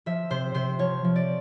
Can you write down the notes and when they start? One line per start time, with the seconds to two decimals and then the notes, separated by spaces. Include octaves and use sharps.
0.06 F3 E5
0.30 C3 C5
0.54 C3 C5
0.79 F3 C#5
1.04 F3
1.16 D5